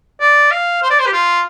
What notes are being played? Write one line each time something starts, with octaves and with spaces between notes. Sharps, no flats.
D5
F5
C5
D5
C5
G4
F4